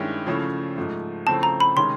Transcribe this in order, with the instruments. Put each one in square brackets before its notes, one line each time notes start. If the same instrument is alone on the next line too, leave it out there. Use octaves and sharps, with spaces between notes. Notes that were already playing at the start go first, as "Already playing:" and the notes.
Already playing: [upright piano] G2 D#3 G#3 C#4 E4
C#3 F3 A3 C#4 E4
G#2 F3 A3
[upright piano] C#3 F3 A3 C4 E4 [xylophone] A5
[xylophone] A#5
B5
[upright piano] C3 D#3 G#3 C#4 [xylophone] C6